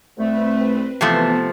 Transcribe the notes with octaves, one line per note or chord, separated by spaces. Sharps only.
C2 A3 C4 B4
C3 E3 F3 A3 B3